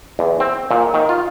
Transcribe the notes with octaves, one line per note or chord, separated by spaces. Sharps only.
E2
C4
A#2
D#3
F4